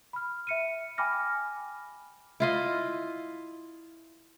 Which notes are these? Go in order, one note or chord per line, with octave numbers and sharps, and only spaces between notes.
B5 F6
E5 C#7 D#7
G5 G#5 B5 D6 F6 A#6
E4 F4 D#5